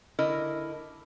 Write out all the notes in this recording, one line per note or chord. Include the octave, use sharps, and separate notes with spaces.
D3 E4 A#4 D#5